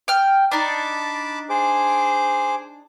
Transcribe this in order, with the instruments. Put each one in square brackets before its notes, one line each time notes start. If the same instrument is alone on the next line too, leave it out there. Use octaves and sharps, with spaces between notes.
[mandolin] G5 F6
[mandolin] D4 D#4 [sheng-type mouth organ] A5 B5 D6
[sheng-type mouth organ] G#4 C5 D6